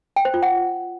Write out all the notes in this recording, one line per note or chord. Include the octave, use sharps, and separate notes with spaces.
G5
C5
F4
F#5